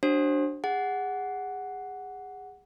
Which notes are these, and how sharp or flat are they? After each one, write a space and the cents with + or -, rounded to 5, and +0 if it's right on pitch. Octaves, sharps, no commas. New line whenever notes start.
D4 +0 F#4 +30 C5 +30
G#4 -30 F#5 +0